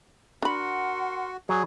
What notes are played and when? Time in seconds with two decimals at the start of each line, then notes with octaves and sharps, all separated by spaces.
0.42 D4 F#4 A#4 F#5 B5 C6
1.49 F#3 G#4 D5